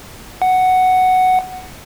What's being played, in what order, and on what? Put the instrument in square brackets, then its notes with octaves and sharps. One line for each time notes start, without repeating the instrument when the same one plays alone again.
[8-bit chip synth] F#5